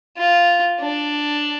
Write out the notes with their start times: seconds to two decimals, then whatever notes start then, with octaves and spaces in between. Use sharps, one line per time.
0.17 F4
0.80 D4